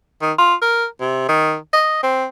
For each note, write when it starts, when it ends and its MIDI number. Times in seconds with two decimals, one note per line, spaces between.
0.22 0.32 51
0.38 0.54 65
0.62 0.85 70
1.00 1.25 48
1.29 1.56 51
1.73 1.99 75
2.03 2.25 60